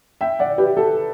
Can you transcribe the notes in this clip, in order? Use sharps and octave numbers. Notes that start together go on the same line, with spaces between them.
E5 G5
D5 F#5
G4 B4
A4